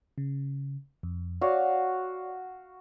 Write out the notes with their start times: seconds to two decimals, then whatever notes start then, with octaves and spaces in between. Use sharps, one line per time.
0.18 C#3
1.03 F2
1.41 F#4 C#5 D5 F5